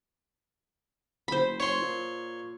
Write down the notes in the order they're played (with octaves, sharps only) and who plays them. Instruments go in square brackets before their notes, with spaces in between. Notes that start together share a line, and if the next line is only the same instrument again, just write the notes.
[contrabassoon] F#1 [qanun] C5 B5
[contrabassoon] F#1 [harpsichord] C#5 C6
[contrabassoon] A#2